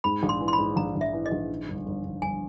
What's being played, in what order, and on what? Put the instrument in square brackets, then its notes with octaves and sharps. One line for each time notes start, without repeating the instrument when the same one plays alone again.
[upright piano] G#2 [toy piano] B5
[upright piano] A#1
[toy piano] C6
[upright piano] E3
[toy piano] C6
B5
[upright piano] G#2
[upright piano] A#1 [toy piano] A#5
[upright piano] A#1
[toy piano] E5
[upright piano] E3
[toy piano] D#5
[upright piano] A#1
D#3
G1
G1
G1
[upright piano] G1 [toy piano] G#5